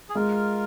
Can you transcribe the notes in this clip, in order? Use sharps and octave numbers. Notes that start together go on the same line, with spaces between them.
G#4
G#3 F4 A#4